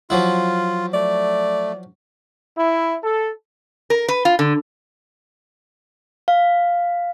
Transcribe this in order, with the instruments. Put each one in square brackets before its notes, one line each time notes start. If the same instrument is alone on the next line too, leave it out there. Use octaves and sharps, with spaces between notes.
[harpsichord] F3 F#3 E4 [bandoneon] F4
[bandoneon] A3 [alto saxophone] D5
[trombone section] E4
A4
[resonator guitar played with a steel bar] A#4
B4
F4
D3
[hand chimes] F5